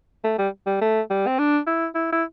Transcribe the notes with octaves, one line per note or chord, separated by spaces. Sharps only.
A3
G3
G3
A3
G3
C4
D4
E4
E4
E4